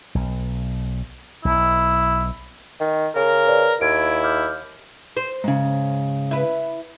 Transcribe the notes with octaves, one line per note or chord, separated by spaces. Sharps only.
B1
B1 E4
D#3
C#3 A#4
B4 D5
D#2 E4 G#6 D7
D6 F6 G6
C5
G#2 C#3
E4 B4